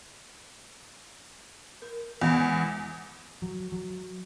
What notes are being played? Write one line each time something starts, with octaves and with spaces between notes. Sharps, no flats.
A#4
E2 G#3 B3
F#3
F#3